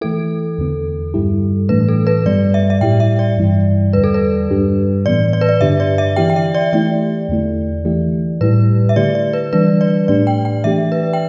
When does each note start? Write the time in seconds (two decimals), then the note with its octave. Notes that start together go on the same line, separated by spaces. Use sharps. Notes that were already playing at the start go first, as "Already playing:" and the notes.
0.01 E3 A3 E4 A4
0.58 E2 D3 B3
1.14 G2 G3 E4 G4
1.69 A2 E3 A3 D4 B4
1.88 A4
2.07 B4
2.26 G2 G3 B3 D5
2.54 E5
2.70 E5
2.81 A2 G3 E4 G4 G5
3.00 E5
3.19 D5
3.38 G2 E3 G3 E4
3.93 E2 D3 G3 B4
4.04 A4
4.14 B4
4.50 G2 G3 D4 G4
5.06 A2 E3 B3 D5
5.33 D5
5.41 B4
5.49 D5
5.61 G2 D3 B3 D4 G4 E5
5.80 D5
5.98 E5
6.16 E3 B3 E4 G4 G5
6.30 G5
6.36 E5
6.54 D5
6.73 E3 A3 E4 G4 D5
7.29 E2 D3 A3 E4
7.85 E3 A3 E4 G4
8.41 A2 G3 E4 G4 B4
8.89 E5
8.96 D3 A3 E4 G4 D5
9.15 D5
9.33 B4
9.53 E3 G3 D4 B4
9.81 D5
10.08 A2 A3 D4 G4 D5
10.27 G5
10.45 G5
10.64 E3 A3 D4 G4 E5
10.92 B4
11.13 G5